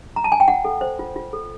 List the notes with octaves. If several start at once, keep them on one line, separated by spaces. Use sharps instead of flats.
A#5
A5
G#5
G5
F4 F#5
A4
C5
F4
F4
A4